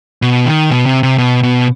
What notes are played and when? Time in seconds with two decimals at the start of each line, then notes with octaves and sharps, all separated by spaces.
0.22 B2
0.46 D#3
0.70 B2
0.86 C3
1.03 C3
1.18 B2
1.43 B2